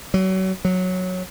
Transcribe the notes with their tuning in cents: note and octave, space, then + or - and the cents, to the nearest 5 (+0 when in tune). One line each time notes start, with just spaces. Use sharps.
F#3 +30
F#3 -10